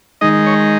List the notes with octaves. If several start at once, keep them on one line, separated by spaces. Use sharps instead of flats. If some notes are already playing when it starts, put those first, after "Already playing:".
D#3 G#3 D#4 D#5
C#5